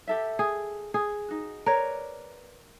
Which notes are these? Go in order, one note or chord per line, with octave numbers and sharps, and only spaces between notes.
G4 A4 E5
G#4
G#4
D#4 F#4
A#4 B4 C#5 D5